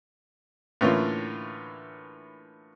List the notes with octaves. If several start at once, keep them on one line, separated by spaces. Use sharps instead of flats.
A2 D3 E3 A#3 C#4 F4